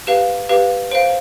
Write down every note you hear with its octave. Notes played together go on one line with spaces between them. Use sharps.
G4 B4 F5 E7
G4 B4 F5
C5 F5 D7